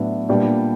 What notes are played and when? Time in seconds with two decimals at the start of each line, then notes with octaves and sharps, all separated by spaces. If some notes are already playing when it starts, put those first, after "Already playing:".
Already playing: A2 F#3 B3 D4 E5
0.29 A#2 G3 B3 D4